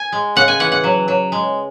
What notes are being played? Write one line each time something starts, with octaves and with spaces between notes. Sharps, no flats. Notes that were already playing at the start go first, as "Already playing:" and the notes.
Already playing: G#5
G#3
C#3 F#5
G#5
E3 F#5
F#5
F#3
F#3
G#3